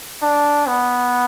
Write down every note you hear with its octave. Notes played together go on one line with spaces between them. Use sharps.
D4
B3